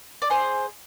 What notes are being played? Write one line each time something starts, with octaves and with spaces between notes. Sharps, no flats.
D5
G#4 C5